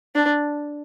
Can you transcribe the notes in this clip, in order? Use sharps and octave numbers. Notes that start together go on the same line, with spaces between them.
D4